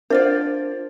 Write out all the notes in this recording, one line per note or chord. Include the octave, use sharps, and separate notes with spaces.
D4 F4 A#4 C5 D5